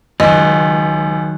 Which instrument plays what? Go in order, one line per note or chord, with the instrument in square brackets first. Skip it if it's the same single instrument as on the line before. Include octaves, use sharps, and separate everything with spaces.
[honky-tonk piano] C#2 [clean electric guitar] D#3 F#3 [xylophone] D#5